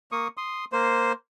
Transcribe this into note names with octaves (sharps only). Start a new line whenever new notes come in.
A#3 C#6 D#6
C6 D#6
A#3 C5